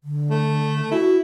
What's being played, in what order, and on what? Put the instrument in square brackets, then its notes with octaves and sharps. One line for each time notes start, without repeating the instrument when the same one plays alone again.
[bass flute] D3
[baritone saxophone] A3
[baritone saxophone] E4 [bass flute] F#4